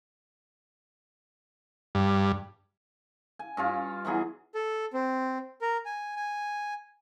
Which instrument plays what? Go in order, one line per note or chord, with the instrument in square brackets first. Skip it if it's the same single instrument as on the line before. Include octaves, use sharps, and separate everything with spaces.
[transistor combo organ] G2
[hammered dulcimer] G#5
G2 C#4 F4
E3 F#3 B3 G#4
[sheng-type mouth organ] A4
C4
A#4
G#5
G#5